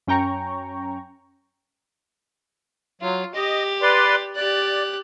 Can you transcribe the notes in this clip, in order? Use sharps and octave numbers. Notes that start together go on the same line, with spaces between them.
F#2 C#4 G5 A#5 C#6
F#3 F4
G4 D#5
B4 D5 C6
G4 D5 F#6